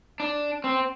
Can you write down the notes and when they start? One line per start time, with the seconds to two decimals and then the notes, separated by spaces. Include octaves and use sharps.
0.20 D4
0.64 C4